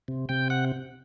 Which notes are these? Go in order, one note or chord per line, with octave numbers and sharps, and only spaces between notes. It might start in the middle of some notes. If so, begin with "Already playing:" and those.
C3
C3 G5
F#5